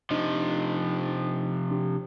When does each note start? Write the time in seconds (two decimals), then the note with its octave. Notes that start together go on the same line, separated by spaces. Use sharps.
0.10 C3 F3 D4 D#4 D#5
1.71 D4 G4